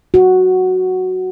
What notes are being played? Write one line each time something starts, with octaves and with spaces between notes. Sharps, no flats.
F#4